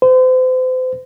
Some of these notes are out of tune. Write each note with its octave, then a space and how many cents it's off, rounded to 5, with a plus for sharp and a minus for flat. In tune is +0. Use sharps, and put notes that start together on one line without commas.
C5 -35